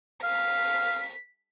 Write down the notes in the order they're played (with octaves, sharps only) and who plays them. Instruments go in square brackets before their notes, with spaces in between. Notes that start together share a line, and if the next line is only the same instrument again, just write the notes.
[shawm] F5 [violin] B6